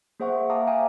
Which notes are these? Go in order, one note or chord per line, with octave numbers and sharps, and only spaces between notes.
A#3 G#4 C5 E5 F#5 C#6
E5 F5 A5 A#5 D6 D#6
E5 F5 G5 G#5 A#5